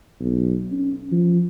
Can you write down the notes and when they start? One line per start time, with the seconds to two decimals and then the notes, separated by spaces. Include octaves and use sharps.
0.20 B1
0.72 C#4
1.12 F3